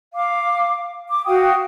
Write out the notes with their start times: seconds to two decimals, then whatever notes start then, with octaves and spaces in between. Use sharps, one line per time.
0.14 F5 D6
1.10 D6
1.26 F#4 F5 G5 D#6